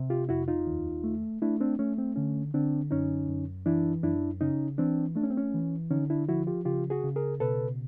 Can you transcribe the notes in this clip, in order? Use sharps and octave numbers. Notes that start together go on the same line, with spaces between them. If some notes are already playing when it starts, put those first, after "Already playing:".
Already playing: C3
F4 G4
F2 E4 F#4
D#4 F4
D#2
A3
A3 D4 E4
C4 D4
A3 C#4
C4
D3 C#4
D3 C4 D4
F#2 C#4 D#4
F#2
E3 D4 E4
F#2 D4 E4
C#3 C#4 D#4
E3 C4 D4
A3 D4
C#4
C4
C#4
E3
D3 C#4 D#4
D4 E4
F3 E4 F#4
F4 G4
C#3 F4 G4
F#4 G#4
C#3
G#4 A#4
B2 A4 B4